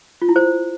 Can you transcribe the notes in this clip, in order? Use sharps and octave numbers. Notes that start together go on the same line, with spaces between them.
F4
E4
C5